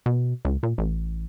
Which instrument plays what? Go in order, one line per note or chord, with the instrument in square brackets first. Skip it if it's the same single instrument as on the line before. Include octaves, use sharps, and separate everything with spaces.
[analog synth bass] B2
C#2
A#2
A1